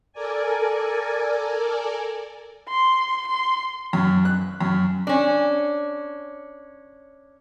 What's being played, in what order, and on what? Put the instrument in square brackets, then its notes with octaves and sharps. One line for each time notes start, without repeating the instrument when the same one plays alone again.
[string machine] A4 A#4 D5 G#5
[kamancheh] C6
C6
[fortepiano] F#2
F#6
F#2
[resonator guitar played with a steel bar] C#4 D4